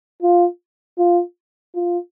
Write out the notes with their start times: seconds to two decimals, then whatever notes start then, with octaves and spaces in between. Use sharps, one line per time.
0.22 F4
0.98 F4
1.75 F4